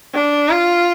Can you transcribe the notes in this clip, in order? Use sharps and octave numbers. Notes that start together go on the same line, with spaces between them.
D4
F4